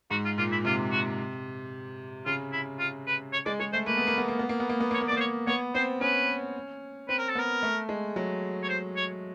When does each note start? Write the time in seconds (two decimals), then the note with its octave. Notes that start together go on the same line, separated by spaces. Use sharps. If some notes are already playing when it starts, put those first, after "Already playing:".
0.11 G#2 F#4
0.25 F4
0.38 A#2 F4
0.52 E4
0.65 C3 F4
0.92 F#4
2.26 C#3 F4
2.52 E4
2.79 F4
3.07 B4
3.33 C#5
3.46 G#3 D5
3.60 G#3 C#5
3.73 A3 C5
3.86 A#3 B4
3.97 B3
4.07 A#3
4.18 B3
4.28 A#3
4.39 B3
4.49 A#3
4.60 B3
4.69 A#3
4.80 B3
4.91 A#3 C#5
5.01 B3
5.08 D5
5.12 A#3 C5
5.20 C#5
5.47 B3 C#5
5.75 C4 C5
6.01 C#4 B4
7.09 C4 B4
7.18 A#4
7.29 A4
7.35 B3 A#4
7.63 A3
7.89 G#3
8.16 F#3
8.63 C#5
8.69 C5
8.97 C#5